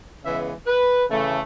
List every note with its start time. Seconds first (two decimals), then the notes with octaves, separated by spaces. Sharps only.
0.23 C#3 E3 G#3 B3 E5
0.67 B4
1.09 C#3 E3 A3